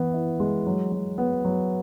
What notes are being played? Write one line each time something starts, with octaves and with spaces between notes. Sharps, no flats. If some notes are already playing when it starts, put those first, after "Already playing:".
Already playing: E3 B3
E4
G#3
F#3
F#3
B3
F#3